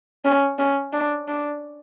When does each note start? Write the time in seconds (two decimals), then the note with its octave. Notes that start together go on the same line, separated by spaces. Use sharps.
0.25 C#4
0.59 C#4
0.93 D4
1.28 D4